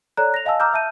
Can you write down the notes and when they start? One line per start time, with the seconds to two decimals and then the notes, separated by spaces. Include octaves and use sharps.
0.17 A4 C#5 D5 A#5 F#6
0.34 A#6 F7
0.45 D#5 F5 G#5 A5 E6
0.60 A#5 D6 E6 F6 G6
0.73 E5 A5 G6 D#7